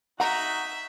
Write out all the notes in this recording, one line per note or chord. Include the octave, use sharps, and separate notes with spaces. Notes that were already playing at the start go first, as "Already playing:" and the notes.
D#4 F#4 E5 F#5 A#5